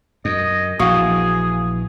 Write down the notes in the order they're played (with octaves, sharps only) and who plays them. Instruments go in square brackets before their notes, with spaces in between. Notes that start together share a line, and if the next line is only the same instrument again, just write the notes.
[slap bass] F#2 [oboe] D#5
[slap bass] A#1 E3 [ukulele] F#4 F5 [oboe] G#4 [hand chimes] D#6